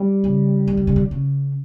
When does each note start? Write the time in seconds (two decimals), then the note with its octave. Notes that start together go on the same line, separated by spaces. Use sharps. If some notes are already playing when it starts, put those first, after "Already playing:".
Already playing: G3
0.24 C#3
0.68 D#3
0.77 D3
0.87 C#3
0.96 D3
1.11 C#3